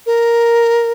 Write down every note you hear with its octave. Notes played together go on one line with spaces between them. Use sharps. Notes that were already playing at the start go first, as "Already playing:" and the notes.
A#4